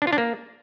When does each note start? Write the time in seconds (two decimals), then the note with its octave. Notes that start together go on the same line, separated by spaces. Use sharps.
0.02 D4
0.07 F4
0.13 D4
0.18 A#3